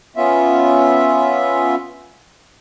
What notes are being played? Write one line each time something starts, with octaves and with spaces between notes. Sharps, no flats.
B3 C#4 F4 E5